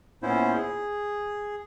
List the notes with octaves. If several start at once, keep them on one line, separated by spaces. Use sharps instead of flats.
A#2 B3 C#4 E4 C5
G#4